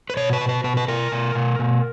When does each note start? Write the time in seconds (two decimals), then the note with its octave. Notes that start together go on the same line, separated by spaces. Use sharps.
0.10 B4
0.17 B2 C#5
0.33 B4
0.41 B2
0.49 B4
0.64 B2 B4
0.77 B4
0.88 B2 A#4
1.12 B2
1.35 B2
1.59 B2